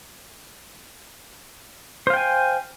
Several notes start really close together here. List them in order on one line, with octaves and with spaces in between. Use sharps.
C5 F5 G5 G#5